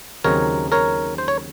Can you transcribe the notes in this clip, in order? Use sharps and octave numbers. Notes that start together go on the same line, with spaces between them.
D#2 C#3 F#3 C4 D#4 A#4 C#5
A#4 C#5
C5
C#5